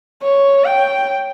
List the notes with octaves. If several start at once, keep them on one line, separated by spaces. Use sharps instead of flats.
C#5
G5